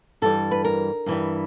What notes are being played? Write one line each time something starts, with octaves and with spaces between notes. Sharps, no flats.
G2 E3 G3 A4
B4
A#4
G2 E3 G3